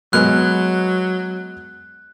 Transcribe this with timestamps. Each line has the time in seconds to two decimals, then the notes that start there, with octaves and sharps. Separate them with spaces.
0.13 F#3 G#3 B3 F6 F#6